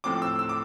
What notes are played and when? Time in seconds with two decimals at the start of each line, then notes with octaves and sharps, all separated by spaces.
0.04 A2 F3 C4 D6
0.22 E6
0.39 E6
0.49 D6